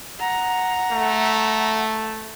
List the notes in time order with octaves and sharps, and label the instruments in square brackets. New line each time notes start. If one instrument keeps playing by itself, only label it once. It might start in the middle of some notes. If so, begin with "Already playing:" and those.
[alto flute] F#5 [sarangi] A#5
[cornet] A3